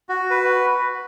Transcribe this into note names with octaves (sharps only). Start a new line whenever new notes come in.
F#4
B4